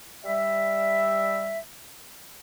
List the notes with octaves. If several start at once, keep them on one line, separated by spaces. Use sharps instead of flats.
G3 E5